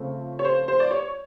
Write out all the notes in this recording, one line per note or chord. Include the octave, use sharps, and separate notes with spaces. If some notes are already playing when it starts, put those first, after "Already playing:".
Already playing: C#3 F3 A3 C4
C#5
C5
C5
D5
C#5